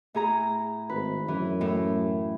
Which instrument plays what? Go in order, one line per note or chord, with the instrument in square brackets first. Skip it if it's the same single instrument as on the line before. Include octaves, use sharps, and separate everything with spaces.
[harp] A2 G#4 A#5
[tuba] G#1 [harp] B4
[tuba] F#2 [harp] E3
[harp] A2